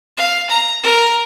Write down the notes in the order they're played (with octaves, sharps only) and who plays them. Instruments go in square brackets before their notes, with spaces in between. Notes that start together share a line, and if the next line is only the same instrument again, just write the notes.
[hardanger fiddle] F5
A#5
A#4